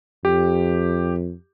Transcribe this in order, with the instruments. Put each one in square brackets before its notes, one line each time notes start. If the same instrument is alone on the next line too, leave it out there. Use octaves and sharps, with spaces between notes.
[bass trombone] F2 [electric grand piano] G4